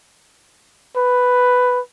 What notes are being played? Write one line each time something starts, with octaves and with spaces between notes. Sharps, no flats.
B4